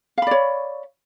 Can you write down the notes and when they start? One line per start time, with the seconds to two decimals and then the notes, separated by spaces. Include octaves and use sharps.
0.18 F5
0.22 B5
0.27 D5
0.31 C#5